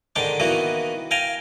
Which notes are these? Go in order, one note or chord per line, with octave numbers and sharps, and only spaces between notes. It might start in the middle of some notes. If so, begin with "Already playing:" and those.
G#2 D3 D#3 D4 G5 D6
D#3 E3 A#3 B3 F#4
F5 G5 G#5 A#5